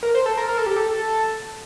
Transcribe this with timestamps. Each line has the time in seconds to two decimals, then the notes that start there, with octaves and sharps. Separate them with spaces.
0.03 A#4
0.15 C5
0.26 A4
0.38 A#4
0.49 A#4
0.58 A4
0.66 G4
0.76 A4